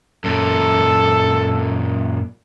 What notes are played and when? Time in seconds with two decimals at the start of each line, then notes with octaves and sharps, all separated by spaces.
0.24 F#2 A#2 A4